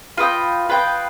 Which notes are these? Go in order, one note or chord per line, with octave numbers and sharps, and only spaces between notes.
F4 B4 D#5 G5
F4 B4 D#5 G5